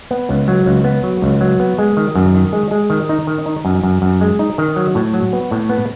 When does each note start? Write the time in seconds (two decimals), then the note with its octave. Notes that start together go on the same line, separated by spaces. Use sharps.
0.11 B3
0.29 C#2
0.48 F#3
0.66 C#2
0.84 B3
1.03 F#3
1.22 C#2
1.41 F#3
1.60 B3
1.78 G#3
1.97 D#3
2.15 F#2
2.34 D#3
2.53 G#3
2.71 G#3
2.90 D#3
3.09 D#4
3.27 D#3
3.46 D#4
3.65 F#2
3.83 F#2
4.02 F#2
4.21 G#3
4.39 D#4
4.58 D#3
4.76 F#3
4.95 A2
5.14 F#3
5.33 B3
5.51 A2
5.69 B3